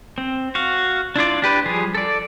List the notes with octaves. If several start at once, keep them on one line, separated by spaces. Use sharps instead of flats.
C4
F#4 F5
D4 E4 F4 D5
D4 G4 B4
F3 G3 G#4
A4 D5